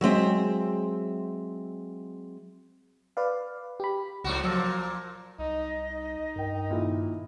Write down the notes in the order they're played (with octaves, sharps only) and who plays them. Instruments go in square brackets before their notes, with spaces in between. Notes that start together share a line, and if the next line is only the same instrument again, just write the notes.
[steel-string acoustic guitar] F#3 G#3 C4 E5
[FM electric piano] B4 D5 F5
G4 B5
[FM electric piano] C#2 [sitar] G#2 C3 F#4
[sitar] A#2 F3 [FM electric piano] F#3 E6 A#6
[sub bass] C2 [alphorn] D#4 [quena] D#5
[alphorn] D#4
[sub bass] G2 [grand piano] A#4 G5
[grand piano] A#2 D#3 E4